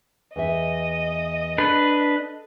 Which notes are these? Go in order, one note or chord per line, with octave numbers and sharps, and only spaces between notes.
E2 D#5 E5
D4 A4 B4